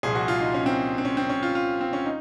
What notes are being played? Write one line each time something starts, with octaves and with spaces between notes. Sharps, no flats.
C2 A#2 F3 G#4
F#4
F4
D#4
C#4
C4
C4
C#4
C4
C#4
F4
F4
C4
C#4
D#4